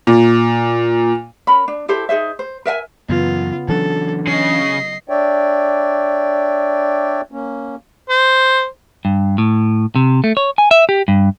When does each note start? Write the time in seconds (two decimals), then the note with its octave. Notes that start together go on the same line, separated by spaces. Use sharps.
0.07 A#2
1.47 C#4 A#4 B5
1.68 D4
1.88 E4 G4 A4 C5
2.09 D#4 G#4 C5 E5
2.39 C5
2.65 A#4 E5 F5 G#5
3.09 F#2 C#3 E3 B3 F4
3.68 E3 F#3 C#4 D4 A4
4.27 C#3 D#5 C7
5.09 D4 C#5 D5 E5 G5
7.32 A#3 C#4
8.09 C5
9.05 G2
9.38 A2
9.95 C3
10.24 A3
10.37 C#5
10.58 G#5
10.71 E5
10.89 G4
11.08 G2